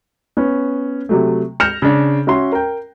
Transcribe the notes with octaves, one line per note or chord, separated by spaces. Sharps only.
B3 C#4
C3 F#3 A3
F6 G6 A#6 C#7 E7 F7
C#3 D4
C#4 F#4 E5 C6
A#4 G5